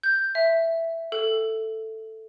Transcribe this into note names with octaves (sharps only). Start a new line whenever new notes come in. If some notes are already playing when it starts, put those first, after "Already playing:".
G6
E5
A4